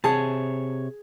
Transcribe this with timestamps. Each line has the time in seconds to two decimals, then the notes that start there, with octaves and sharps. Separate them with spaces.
0.04 C3 G#4 C#5 A5